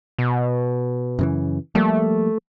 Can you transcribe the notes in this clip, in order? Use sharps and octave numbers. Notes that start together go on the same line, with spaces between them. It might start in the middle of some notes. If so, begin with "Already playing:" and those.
B2
F#2 C#3 E3
F3 G3 A3 A#3